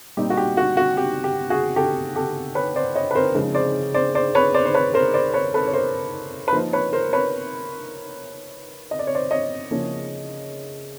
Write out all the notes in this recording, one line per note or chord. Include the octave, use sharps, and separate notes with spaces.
A#2 G3 C4 D#4 G4
F#4
G4
F#4
F#4
G4
G4
F#4 G#4
G4 A4
G4 A4
B4 C#5
C5 D5
C#5 D#5
B4
A#4 C5
C#3 F3 G#3 C4 D#4
C5 D5
C5 D5
C5 D5
B4 C#5
C5 D5
C5
B4 C#5
A#4 C5
C5 D5
B4 C#5
A4 B4
C#5
A#4 C5
B4
F3 A#3 D#4 A#4 C5
B4 C#5
A#4 C5
B4 C#5
D#5
D5
C#5
C5 D5
C#5 D#5
C#3 F3 A#3 C#4 E4